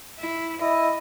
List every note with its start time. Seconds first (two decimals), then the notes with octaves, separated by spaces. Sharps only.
0.19 E4
0.61 E4 D#5